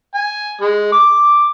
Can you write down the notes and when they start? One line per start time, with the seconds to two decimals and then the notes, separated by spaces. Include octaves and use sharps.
0.15 G#5
0.61 G#3
0.92 D6